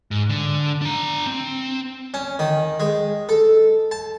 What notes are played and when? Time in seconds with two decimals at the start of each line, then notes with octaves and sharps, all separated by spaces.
0.11 G#2
0.29 D3
0.82 D4 A#5
1.27 C4
2.14 C#4
2.39 D#3
2.80 G#3
3.29 A4
3.91 A5